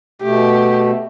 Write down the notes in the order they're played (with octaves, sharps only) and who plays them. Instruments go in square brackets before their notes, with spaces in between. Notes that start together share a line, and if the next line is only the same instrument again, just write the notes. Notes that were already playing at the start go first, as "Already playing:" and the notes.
[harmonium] B2 A3 [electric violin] G4